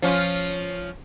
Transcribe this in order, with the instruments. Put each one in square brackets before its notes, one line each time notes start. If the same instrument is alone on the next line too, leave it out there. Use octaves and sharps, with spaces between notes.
[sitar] F3 C#4 F4